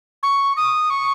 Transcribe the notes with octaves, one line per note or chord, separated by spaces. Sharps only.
C#6
D#6
C#6